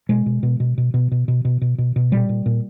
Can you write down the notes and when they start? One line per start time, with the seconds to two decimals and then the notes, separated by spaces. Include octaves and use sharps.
0.09 B2 G#3
0.26 B2
0.43 B2
0.60 B2
0.78 B2
0.94 B2
1.11 B2
1.28 B2
1.45 B2
1.61 B2
1.78 B2
1.96 B2
2.12 A#2 G3
2.29 A#2
2.46 A#2